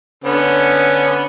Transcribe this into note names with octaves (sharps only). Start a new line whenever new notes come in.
D3 B3 C#4